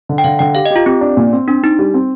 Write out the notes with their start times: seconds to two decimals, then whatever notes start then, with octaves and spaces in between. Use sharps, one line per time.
0.09 D3
0.18 G5
0.24 D3 F5
0.39 D3 G5
0.55 G4 F5
0.66 D#5
0.71 G4
0.76 F4
0.86 C4 G4
1.01 D4
1.17 A#2
1.32 C4
1.48 C4 D4
1.63 C4 D#4
1.79 G3
1.94 C4